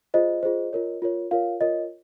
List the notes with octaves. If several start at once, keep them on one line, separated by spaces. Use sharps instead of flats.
F4 G#4 C5 D#5
F4 G#4 C5
F4 A#4 C#5
F4 A#4 C#5
F4 A#4 C#5 F5
F4 A#4 C#5 D#5